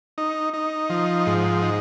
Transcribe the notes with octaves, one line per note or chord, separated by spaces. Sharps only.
D#4
D#4
F3
G#2
D#4